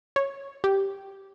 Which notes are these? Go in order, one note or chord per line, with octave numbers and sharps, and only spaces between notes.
C#5
G4